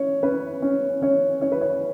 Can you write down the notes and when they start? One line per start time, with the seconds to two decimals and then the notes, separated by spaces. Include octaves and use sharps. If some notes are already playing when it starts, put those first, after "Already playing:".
Already playing: C#4 C#5
0.23 C#4 B4
0.62 C#4
1.02 C#4 C#5
1.41 C#4 C#5
1.52 B4
1.61 C#5